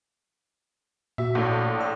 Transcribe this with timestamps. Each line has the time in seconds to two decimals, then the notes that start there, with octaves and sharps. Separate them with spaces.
1.18 A#2 F#4 E5
1.35 A#1 A2
1.79 D5 G5 E6